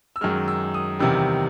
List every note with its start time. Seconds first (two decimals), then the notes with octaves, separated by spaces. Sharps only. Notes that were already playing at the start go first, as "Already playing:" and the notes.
0.16 E6
0.21 F#2 D#3 G#3 F6
0.48 E6
0.74 D#6
0.99 E2 C3 D#3 G3 E6